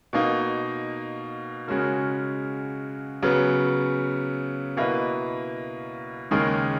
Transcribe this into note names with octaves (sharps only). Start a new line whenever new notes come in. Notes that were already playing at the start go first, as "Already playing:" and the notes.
B2 A#3 D#4
C#3 G#3 C#4 F#4 A#4
C#3 F#3 B3
B2 A#3 E4 B4 D#5
D#2 C#3 G#3 D#4 A#4